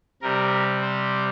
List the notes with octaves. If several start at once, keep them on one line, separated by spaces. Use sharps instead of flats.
C3 G3 A#4
C5